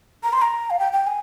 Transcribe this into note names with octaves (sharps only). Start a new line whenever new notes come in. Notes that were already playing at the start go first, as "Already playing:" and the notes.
A#5
C6
A#5
F5
G5
G5
G#5